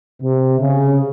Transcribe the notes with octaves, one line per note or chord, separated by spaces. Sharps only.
C3
C#3